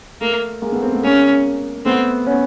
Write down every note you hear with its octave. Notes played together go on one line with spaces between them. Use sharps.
A3 A#3
G#3 A#3
A3 B3
A#3 C4
A3 B3
G#3 A#3 C#4
A3 B3 C4
B3 C#4